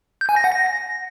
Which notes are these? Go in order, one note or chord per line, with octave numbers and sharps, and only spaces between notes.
G6
G#5
A#6
F#5
A#6